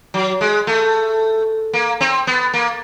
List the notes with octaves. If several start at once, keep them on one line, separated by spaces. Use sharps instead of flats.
F#3
G#3
A3
A#3
C4
B3
A#3